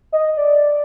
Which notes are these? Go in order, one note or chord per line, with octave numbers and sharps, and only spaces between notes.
D#5
D5